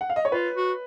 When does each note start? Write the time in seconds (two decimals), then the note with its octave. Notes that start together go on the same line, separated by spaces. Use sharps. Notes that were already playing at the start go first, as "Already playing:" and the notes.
0.01 F#5
0.10 F5
0.16 D#5
0.25 C#5
0.32 F4 B4
0.56 F#4